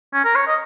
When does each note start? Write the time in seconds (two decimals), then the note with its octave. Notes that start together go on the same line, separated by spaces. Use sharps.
0.13 C#4
0.24 A#4
0.35 C#5
0.47 D#5